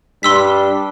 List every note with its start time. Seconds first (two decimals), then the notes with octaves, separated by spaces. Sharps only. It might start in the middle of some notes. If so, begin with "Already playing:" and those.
0.23 G2 G3 D4 C6 E6 B6